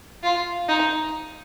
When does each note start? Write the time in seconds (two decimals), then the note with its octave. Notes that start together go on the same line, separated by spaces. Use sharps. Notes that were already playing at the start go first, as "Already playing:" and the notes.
0.23 F4
0.68 D#4